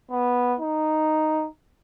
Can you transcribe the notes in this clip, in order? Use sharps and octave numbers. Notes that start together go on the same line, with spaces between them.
B3
D#4